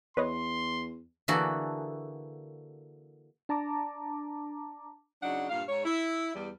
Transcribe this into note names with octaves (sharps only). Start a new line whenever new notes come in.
E2 B4 C#5 D#5 C6
D3 E3 A#3 F#4 G#4 A4
D4 A5 A#5 D6
C#3 F#3 D4 D#4 F#5
G2 A#2 F5
G#2 C#5
E4
E2 G3